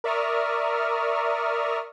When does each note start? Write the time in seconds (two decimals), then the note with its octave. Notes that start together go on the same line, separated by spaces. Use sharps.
0.04 A#4 D5 E5 C#6 D#6 F6